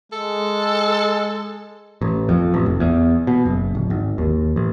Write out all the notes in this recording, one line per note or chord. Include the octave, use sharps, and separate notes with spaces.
G#3 A4
A1
F2
A1
F1
E2
B2
F#1
D1
G#1
D#2
A1